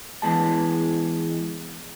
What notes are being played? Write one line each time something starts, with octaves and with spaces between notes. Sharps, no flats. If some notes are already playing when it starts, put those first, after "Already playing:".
E2 E3 G#3 A5